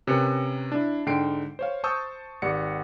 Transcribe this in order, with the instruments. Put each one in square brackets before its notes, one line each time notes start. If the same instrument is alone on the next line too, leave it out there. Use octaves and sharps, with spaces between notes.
[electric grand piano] C3 C#4 A#4 B4 C#7
D4 E4
G#2 D3 G5 C7 D7
C5 C#5 F5
C5 A5 C#6 D#6 E6 G6
G#1 G4 D5 F#5 C#7